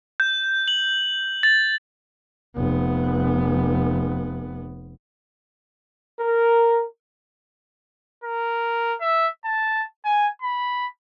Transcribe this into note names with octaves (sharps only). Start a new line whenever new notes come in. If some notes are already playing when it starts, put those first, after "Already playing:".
G6
F#7
A6
F1 B3
A#4
A#4
E5
A5
G#5
B5